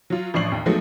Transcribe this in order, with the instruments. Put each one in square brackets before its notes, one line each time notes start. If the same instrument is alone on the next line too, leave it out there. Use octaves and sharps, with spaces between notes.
[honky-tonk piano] F#3 F4
A1 F3 D4 C#6 C7 F#7
D#2
F3 F#3 G#3 A3 B3 D#4